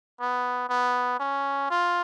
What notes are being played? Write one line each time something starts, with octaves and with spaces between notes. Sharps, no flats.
B3
B3
C#4
F4